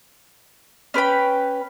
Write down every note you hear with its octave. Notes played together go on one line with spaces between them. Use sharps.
C#4 B4 G5 B5